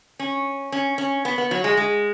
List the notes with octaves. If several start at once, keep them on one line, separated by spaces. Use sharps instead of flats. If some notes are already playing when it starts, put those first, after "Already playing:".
C#4
C#4
C#4
B3
B3
F#3
G#3
G#3